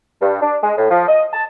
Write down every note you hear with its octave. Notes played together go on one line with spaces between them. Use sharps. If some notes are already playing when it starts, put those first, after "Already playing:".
G2
D4
G#3
A2
F3
D#5
A5